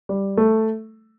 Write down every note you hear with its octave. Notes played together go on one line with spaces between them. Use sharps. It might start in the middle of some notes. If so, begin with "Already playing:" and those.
G3
A3